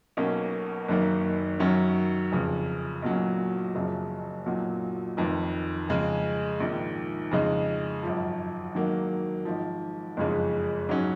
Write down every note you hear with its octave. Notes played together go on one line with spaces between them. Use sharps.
B1 B2 A#3 C#4
F#1 F#2 D#3 A#3
F#2 D#3 F#3 C#4
F1 F2 C#3
B1 A#2 F#3 C#4
F#1 F#2 C#3 F3
B1 A#2 F#3
F1 F2 D#3
F2 C#3 G#3
A#1 G#2 D#3
F2 C#3 G#3 D#4
G#1 F#2 F3
G#2 D#3 F#3 A#3
G#1 G#2 F3
F#1 F2 C#3 G#3 D#4
G#2 F#3 C#4